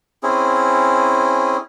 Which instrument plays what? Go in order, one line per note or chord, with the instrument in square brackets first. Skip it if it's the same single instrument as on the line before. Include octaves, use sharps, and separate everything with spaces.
[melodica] C4 C#4 E4 G#4